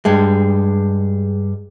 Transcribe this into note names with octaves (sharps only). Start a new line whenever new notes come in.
G2 G3 G#3